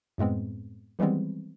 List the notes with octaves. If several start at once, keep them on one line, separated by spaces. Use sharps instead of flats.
F#2 A2 G#3 B3 C4
D#3 E3 G3 G#3 B3 C4